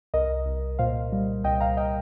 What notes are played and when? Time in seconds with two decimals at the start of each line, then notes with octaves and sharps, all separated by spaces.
0.14 C2 A#4 D#5
0.46 C2
0.79 A#2 C5 F5
1.12 G3
1.44 C2 D#5 G5
1.60 F5 A#5
1.77 D#5 G5